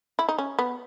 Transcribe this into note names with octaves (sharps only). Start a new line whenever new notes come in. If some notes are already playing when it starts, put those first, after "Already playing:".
E4
D#4
C#4
B3